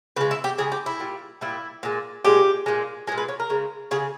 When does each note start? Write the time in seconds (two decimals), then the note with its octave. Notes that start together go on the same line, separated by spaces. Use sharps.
0.16 C#3 G#3 B4
0.31 E4
0.44 G4
0.58 C#3 G#3 G#4
0.72 G4
0.86 E4
1.00 A#2 G3
1.41 A#2 G3 E4
1.83 A#2 G#3
2.25 A#2 G#3 G4
2.66 A#2 G#3
3.07 G#3 G#4
3.12 A#2
3.18 B4
3.29 C#5
3.40 A#4
3.50 C#3 G#3
3.91 C#3 G#3 G#4